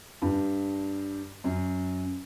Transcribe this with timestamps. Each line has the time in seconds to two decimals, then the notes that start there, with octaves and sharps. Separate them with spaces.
0.22 G2
1.44 F#2